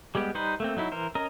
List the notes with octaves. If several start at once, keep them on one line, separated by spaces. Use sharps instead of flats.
G3 G#3 B3 G4
G3 D#4 B4 C5
A3 A#3 C4
F#3 D#4 E4
E3 A#4 C5
C#4 A#4 D#5 A#5